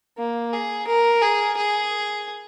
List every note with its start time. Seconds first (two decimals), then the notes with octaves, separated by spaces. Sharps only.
0.18 A#3
0.53 G#4
0.87 A#4
1.22 G#4
1.57 G#4